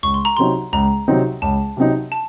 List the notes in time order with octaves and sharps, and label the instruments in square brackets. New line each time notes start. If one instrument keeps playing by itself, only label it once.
[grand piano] C#2 [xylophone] C#6
[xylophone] C6
A#5
[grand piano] C3 F#3 C4 D#4 [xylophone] C6
[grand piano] C#2 [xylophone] A#5
[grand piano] C3 F#3 C4 D#4
[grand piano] C#2 [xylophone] A5
[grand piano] C3 F#3 C4 D#4
[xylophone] A5